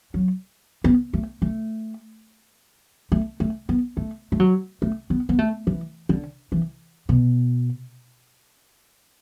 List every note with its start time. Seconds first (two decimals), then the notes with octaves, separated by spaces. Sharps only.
0.14 F#3
0.84 B3
1.13 A3
1.42 A3
3.12 A3
3.40 A3
3.69 B3
3.97 A3
4.32 A3
4.40 F#3
4.82 A3
5.10 B3
5.29 B3
5.39 A3
5.67 E3
6.09 D3
6.52 E3
7.09 B2